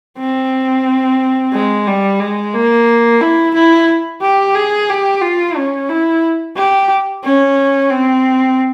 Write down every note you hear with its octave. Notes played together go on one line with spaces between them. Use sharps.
C4
G#3
G3
G#3
A#3
E4
E4
G4
G#4
G4
F4
C#4
E4
G4
C#4
C4